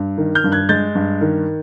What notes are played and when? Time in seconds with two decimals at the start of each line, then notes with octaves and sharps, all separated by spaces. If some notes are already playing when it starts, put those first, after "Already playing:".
Already playing: G2
0.18 D#3
0.35 F6 G6
0.44 G2
0.52 F#6 G#6
0.69 G#3 G6 A6
0.95 G2
1.21 D#3